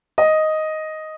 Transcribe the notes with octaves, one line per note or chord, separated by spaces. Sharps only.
D#5